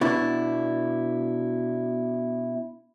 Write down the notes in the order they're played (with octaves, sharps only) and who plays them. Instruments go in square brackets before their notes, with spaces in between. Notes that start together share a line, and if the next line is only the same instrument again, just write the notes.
[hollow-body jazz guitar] B2 D4 E4